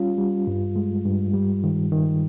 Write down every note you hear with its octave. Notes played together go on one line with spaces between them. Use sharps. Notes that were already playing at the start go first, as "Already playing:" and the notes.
Already playing: G3 C#4 F4
G3
G2
G#3
G2
G3
D#3
D#3